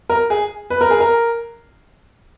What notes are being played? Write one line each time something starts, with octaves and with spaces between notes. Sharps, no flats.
A#4
G#4
B4
A#4
G#4
A#4